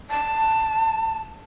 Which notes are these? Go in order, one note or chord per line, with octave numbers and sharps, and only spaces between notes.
A5